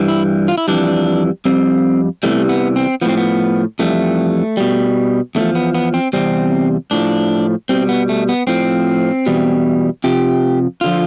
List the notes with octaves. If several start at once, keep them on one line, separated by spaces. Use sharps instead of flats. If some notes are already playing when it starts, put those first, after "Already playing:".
Already playing: G2 E3 G3
E4
F4
E4
F2 E3 G3 D4
F2 C3 G3 C4
E2 C3 E3 G3 A3
B3
C4
A2 F3 B3 C4
B3
F2 E3 G3 A3
B2 G3
E2 D3 A3
F3
B3
B3
C4
E2 C3 G3 C4
A2 F3 D4
B2 G3 C4
B3
A3
B3
A2 F3 C4
E2 B2 G3
F2 C3 F3 G4
D3 F3 F4